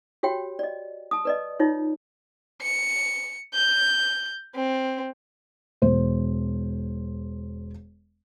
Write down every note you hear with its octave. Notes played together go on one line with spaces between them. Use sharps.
F#4 G4 C#5 G5
D5 D#5
A5 D#6
B4 D5 D#5
D#4 F4 C#5
C#7
G6
C4
E1 C5